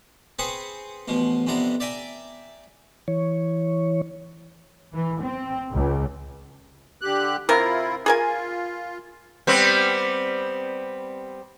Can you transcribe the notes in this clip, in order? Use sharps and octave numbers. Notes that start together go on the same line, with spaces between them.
C4 G#4 B4 C5 C#6 D#6
A1 B2 F3
F2 C3 B3 D4 A#5
D5 E5 G5 G#5 A#5
E3 C#5
E3
C4
C#2
D3 G4 F#6
C3 E4 F4 A#4
F4 G#4 A#4 G#5
G3 B3 C4